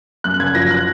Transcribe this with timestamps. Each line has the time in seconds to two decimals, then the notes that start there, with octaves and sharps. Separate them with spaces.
0.24 F#2 F#6
0.39 F#1 G#6
0.55 F3 A#6
0.71 F#6